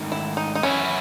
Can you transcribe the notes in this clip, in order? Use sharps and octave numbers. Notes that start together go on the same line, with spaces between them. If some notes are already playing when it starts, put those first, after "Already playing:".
Already playing: G#2 D#3 A3 C#4
E4
D#4
D#4
F#2 E3 B3 C#4 E4